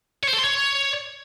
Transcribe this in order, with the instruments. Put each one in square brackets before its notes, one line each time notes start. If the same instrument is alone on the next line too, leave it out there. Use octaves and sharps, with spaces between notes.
[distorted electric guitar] C#5
C5
A4
C6
C#5